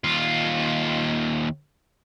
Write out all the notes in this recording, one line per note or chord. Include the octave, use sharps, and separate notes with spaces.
D#2 F4